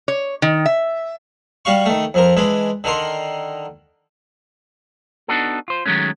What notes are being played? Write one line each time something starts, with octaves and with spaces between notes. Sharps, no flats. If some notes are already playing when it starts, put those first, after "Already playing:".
C#5
D#3
E5
G3 F#4 F5 C#6
D#3 A3
F2 F3 A#4
E3 G#3 D4
D3 D#3 A#4 C6
B3 D4 D#4 F#4 A4
F4 C5
D#3 F#3 G#3 A3 C#4